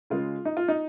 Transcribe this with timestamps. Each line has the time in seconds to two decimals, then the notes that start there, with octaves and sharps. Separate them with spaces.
0.10 C#3 G#3 F4
0.45 D#4
0.57 F4
0.68 D#4